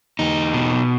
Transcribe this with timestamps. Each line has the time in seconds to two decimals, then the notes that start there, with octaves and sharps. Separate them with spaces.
0.19 E2 D#4
0.54 B2